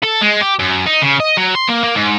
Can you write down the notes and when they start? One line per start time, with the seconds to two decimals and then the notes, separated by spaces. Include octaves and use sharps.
0.03 A4
0.22 G#3
0.41 G4
0.59 F#2
0.86 D#4
1.02 C#3
1.20 D#5
1.37 F#3
1.55 C6
1.68 A#3
1.83 A#3
1.95 G#2